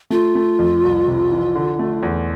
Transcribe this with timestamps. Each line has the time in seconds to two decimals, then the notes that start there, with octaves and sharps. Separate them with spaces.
0.10 A3 F4
0.35 A3
0.59 F2
0.83 C2
1.07 C3
1.32 E3
1.55 D3
1.79 A3
2.03 E2